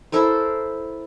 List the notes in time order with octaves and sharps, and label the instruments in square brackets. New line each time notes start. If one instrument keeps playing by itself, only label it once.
[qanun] E4 A4 A#4 C5